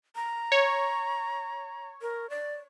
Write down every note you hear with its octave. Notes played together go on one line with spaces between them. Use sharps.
A#5
C#5
A#4
D5